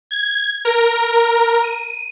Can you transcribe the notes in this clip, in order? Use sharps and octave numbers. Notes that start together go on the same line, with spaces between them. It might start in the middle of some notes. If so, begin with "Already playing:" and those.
G#6
A#4
D#7